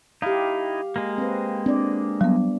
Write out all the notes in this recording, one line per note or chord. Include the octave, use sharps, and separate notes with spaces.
D#4 E4 G4 F5
G#3 A#3
C4 B4
C4 D4 D5
F#3 G3 B3